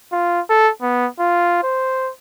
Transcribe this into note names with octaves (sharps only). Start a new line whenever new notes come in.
F4
A4
B3
F4
C5